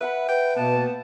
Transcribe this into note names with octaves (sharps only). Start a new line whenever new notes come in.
B4 E5 F#5 B5
B4 G5
B2 A#3 B3 A5